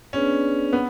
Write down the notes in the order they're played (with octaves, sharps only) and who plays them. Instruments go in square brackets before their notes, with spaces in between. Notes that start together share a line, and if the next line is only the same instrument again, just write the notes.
[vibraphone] B3 D4 G#4 B4 D5 [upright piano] C#4
[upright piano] B3 [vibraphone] B4 F#5